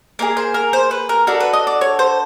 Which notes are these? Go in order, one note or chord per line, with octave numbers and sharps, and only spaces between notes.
A#3 D#4 G#4 A#4
C5
A#4
C5
B4
A#4
D4 F#4 A4 A#4
B4
D#5
D5
C#5
C5